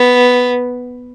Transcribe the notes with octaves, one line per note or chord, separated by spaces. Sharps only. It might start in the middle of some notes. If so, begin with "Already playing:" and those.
Already playing: B3